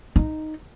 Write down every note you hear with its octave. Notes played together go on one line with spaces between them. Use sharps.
D#4